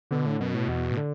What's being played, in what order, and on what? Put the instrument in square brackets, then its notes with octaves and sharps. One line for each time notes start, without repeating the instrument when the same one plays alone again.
[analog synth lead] B2 [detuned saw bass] D3
[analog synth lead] A2
[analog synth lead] F#2 [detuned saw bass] B2
[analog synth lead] A2
[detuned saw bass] E2 [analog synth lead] B2
[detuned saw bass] A2
[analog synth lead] D3